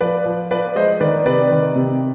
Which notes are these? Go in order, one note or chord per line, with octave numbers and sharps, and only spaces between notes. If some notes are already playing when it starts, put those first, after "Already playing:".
F3 B4 D5
F3
F3 B4 D5
G#3 C5 D#5
D#3 B4 D5
C3 B4 D5
D#3
C3